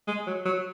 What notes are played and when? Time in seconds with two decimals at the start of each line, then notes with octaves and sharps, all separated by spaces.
0.08 G#3
0.27 F#3
0.45 F#3